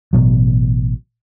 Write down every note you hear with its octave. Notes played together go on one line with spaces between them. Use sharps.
A1 B2 F#3